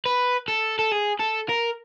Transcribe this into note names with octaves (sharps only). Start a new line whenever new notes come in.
B4
A4
A4
G#4
A4
A#4